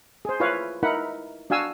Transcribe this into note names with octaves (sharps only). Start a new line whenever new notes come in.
G#4 C5
E4 F4 B4 C#5 F5
D#4 E4 A#4 F#5 B5
D4 F#4 F5 G#5 E6